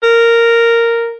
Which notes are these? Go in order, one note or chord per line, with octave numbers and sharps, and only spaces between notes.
A#4